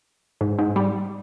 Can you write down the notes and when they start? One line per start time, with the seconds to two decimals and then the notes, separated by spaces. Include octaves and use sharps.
0.41 G#2
0.59 G#2
0.76 G3